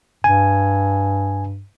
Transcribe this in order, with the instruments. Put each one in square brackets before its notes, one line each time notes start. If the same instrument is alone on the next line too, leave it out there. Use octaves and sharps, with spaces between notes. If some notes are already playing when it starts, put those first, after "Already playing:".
[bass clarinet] G2 [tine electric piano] G#5